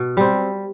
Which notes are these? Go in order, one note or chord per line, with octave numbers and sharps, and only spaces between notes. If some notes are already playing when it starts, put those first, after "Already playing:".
Already playing: B2
G3 C4